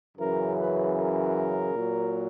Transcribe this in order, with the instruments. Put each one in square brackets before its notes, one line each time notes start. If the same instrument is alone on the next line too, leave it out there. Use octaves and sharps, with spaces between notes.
[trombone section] F#2 C#3 E3 A#4
B4
A#4
A#2 F#3